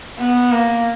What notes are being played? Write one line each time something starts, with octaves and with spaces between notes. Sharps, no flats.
B3
A#3